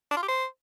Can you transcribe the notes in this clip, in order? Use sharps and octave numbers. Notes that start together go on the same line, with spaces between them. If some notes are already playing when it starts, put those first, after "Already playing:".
D4
F4
G4
C5